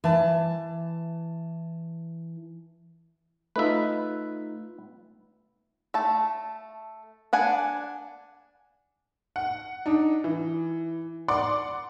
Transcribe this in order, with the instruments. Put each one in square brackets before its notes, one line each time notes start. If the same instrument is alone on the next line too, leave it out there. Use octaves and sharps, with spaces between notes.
[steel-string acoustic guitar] E3 A5
[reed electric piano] A3 D#4 F4 [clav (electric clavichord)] B4 E5
[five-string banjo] A3 A5
D4 F#5 G#5
[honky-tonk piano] F#5
D4 D#4
E3
D5 F#5 C6 D6